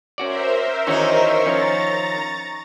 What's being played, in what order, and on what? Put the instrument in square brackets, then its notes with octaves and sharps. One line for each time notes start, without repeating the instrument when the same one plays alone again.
[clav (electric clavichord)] C#4 F#4 D5 [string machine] A#4 C5 E5
[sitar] D#3 D#4 [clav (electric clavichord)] E3 C#4 F#4 [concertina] C#6
[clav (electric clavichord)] F3 C#4 C#5 [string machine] A#5 A6